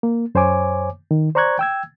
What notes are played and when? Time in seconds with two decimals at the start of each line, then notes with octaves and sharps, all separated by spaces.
0.03 A#3
0.35 F#2 C5 C#5 G#5 D6
1.11 D#3
1.35 C5 D5 A#5 C#6 F#6 G#6
1.59 G5 E6 G#6